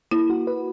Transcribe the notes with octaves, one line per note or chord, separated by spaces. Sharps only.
A#3 E4
F#4
B4